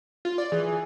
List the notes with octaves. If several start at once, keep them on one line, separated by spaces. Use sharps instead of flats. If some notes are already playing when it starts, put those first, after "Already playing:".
F4
D5
E3 G#4